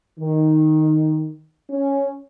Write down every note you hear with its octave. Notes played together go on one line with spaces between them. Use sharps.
D#3
C#4